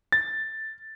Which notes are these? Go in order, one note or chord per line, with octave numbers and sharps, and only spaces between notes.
A6